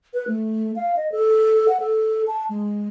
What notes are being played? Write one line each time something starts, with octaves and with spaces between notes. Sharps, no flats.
B4
A3
F5
D#5
A4
F#5
A4
A5
G#3